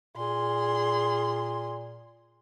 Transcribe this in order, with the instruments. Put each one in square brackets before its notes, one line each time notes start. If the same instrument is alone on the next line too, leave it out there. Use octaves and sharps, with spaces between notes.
[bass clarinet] A#2 [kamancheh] G#4 C6